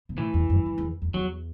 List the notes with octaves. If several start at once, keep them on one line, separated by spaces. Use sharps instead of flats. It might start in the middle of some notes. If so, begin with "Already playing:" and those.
B2
A2 E3
E2
F#2
F#2
E2
E2
E2 F#3